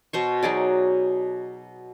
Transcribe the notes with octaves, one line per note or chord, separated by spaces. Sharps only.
B2 C5 C#6
F#3 D#4 G#4 D5